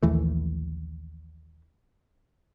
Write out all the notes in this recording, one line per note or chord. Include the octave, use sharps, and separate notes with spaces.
A#1 D#2 E3 A3